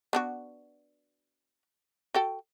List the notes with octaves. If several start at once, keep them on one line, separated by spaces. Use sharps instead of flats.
B3 D4 F#4
F#4 A4 G5